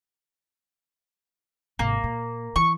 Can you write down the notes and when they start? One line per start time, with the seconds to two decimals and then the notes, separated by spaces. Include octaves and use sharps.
1.79 G#1 C3 A#3
2.04 A#2
2.56 E3 C#6